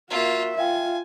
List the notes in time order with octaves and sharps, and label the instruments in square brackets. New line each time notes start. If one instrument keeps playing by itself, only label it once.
[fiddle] A#3 F4 [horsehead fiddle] F#4 E5
[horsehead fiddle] F4 [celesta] E5 F5 G5 [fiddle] G#5